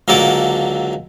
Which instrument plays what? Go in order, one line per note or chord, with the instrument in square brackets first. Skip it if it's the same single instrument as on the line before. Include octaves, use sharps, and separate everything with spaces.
[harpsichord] C#2 D3 F#3 A#3 A4 D6